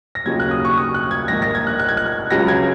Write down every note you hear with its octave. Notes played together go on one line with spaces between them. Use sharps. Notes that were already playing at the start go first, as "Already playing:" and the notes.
A#6
D#2 C#3 F#3 D#4 G#6
F#6
D#6
C#6
D#6
F#6
G#6
A#1 G#2 D#3 A#6
A#6
G#6
F#6
F#6
G#6
F#6
C#2 C#3 F#3 A#6
G#6